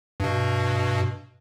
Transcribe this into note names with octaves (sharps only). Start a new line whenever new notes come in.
G2 B2